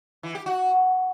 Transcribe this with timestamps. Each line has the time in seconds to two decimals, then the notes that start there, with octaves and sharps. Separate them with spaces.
0.23 E3
0.35 G4
0.46 F#4